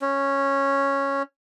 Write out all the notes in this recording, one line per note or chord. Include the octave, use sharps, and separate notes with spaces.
C#4